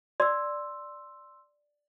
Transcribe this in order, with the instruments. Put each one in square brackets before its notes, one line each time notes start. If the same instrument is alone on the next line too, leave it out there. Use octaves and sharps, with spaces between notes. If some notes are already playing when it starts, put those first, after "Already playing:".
[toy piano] D5 [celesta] C6 E6